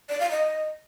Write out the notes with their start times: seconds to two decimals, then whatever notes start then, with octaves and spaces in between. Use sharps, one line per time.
0.09 D5
0.20 F5
0.31 D#5